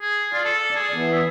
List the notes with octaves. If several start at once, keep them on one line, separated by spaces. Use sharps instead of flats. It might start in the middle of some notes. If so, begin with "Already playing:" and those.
G#4
F4 D5
A4
G#4 D5
E3 B3
E5